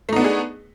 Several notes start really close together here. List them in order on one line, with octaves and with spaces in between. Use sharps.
A3 D#4 B3 D4 G#4